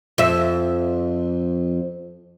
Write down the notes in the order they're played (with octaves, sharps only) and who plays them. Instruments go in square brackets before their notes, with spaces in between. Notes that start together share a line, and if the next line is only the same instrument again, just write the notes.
[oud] F2 E5